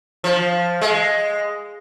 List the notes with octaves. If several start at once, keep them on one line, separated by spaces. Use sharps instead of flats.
F3
G#3